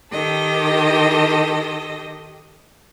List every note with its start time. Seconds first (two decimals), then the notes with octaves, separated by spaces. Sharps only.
0.12 D#3 G4 A4 D#5